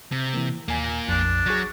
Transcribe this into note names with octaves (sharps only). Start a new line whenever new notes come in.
C3
E3 A#3
D#2 A#2 A#3 G#5
A#1 F2 D4
F#3 G#4 C#6 A#6